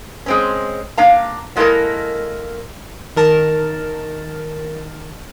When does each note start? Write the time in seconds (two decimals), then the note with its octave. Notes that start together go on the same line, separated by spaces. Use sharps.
0.26 G#3 C4 C#4
0.98 A#3 D4 F5 A#5
1.56 F#3 G#3 A#3 E4 A4 A#4
3.16 D#3 A#4 A5